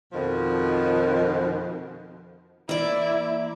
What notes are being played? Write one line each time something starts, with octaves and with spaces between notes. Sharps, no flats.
F2 B2 D#3 F3
E3 A#3 E4 D5